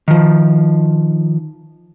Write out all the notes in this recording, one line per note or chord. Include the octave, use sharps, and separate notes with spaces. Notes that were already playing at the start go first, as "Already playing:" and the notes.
D#3 F3